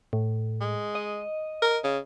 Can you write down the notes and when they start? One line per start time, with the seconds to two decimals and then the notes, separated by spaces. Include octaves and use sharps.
0.13 A2
0.61 G#3
0.95 D#5
1.62 A#4
1.84 C#3